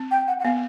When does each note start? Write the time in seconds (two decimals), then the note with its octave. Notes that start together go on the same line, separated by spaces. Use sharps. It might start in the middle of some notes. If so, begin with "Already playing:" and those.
Already playing: C4
0.11 G5
0.27 F#5
0.39 F#5
0.44 B3 F5